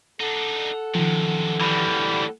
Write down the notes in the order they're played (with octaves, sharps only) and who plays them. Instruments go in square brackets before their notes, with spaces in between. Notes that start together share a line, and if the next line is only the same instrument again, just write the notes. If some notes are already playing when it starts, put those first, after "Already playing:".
[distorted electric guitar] D4 D#4 [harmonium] A4 F#5
[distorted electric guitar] F#2 C3 [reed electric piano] D#3 F3
[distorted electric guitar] A2 D3 [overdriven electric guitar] E3 G3